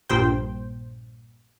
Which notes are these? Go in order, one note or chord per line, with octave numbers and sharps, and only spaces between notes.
A#1 G2 A#2 C5 G5